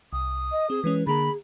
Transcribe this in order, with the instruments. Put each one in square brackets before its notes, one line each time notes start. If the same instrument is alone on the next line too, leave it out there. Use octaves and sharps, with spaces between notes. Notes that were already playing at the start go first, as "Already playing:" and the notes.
[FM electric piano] C2 [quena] D#6
[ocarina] D#5
[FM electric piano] C4 [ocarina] G#4
[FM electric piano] E3 G#3 C#4 [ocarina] B4
[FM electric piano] D3 A#3 A#5 [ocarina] G#4 [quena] B5